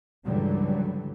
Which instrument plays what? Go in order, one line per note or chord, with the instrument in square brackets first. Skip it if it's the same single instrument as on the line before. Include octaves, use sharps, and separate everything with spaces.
[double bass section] C#2 G2 D3 E3 F#3 G3